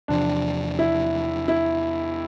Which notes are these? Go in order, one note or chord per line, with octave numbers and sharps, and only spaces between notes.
E2 C3 F3 D4
E4
E4